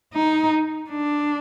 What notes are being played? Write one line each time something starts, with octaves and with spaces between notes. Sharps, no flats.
D#4
D4